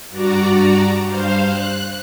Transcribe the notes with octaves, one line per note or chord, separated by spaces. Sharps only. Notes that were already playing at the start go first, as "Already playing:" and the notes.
G2 F#4 D5 A#5
G2 C5 F5
F#6